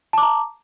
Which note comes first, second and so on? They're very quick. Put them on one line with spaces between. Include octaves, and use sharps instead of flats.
A5 D6 A#5